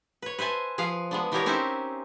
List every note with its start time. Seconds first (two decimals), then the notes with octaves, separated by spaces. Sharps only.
0.22 B4 C#5
0.39 B4 C5 E5 G#5 A5
0.78 F3 G#4 B4 F5
1.11 G#3 B3 D4
1.32 E3 B3 D4 G4 A#4 C#5
1.46 C4 C#4 D#4 G4 C5 E5